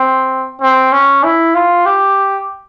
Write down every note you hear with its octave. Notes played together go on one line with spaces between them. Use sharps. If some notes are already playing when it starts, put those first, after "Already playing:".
Already playing: C4
C4
C#4
E4
F4
G4